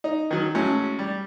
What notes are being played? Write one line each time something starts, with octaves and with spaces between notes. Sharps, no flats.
D#4
D#3 F#3
A2 F#3 G#3 C#4
G3